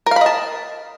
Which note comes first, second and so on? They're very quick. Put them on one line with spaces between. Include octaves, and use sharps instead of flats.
A#4 F5 B5 D#5 A5